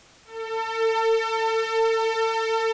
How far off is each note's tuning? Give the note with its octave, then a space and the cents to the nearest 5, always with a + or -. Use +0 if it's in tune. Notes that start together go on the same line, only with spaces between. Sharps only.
A4 +35